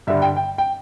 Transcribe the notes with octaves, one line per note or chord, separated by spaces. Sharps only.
G2 D3 G3 E5
G5
G5
G5